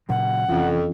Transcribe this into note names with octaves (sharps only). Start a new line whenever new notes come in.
A#2 C#3 F#3 F#5
F1 F2 E3 C#4 F4